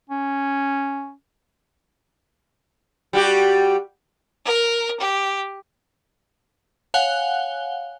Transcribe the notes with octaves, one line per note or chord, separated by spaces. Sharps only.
C#4
G3 F#4 G4
A#4
G4
C#5 F5 F#5 G#5 F#6 G7